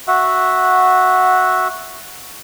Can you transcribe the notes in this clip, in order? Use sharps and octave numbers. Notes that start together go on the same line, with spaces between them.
F#4 E5 F#5